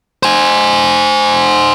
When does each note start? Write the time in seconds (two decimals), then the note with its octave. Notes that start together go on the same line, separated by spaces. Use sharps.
0.23 C5 G#5